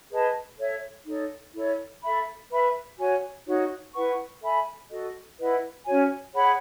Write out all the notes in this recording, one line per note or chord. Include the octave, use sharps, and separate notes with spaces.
G#4 B4 D#5 A5
A4 C#5 E5
D#4 A4 C#5
E4 A4 C#5
A4 E5 B5
B4 E5 B5
F#4 C#5 G#5
D#4 F#4 C#5
E4 B4 F#5 C#6
A4 E5 G#5 B5
F#4 A4 D#5
E4 B4 D#5 F#5
C#4 F#4 C#5 G#5
G#4 C#5 F#5 B5